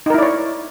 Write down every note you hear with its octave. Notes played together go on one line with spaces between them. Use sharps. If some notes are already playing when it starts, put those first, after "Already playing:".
D#4 E4 A#4 C#5 D5